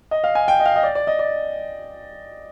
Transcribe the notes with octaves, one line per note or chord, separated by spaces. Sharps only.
D#5
F5
G#5
G5
D#5
F5
D#5
D5
D5
D#5
D5